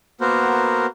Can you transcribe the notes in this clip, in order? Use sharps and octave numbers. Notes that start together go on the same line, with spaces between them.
A#3 B3 F#4 A#4 C5